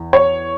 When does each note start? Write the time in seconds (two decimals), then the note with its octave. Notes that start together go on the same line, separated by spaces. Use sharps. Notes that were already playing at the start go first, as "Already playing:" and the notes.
Already playing: E2
0.13 C#5